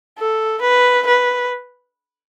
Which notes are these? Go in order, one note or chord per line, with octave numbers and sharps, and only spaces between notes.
A4
B4
B4